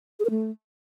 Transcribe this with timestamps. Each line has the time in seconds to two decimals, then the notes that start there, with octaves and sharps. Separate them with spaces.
0.20 G#4
0.25 A#4
0.30 A3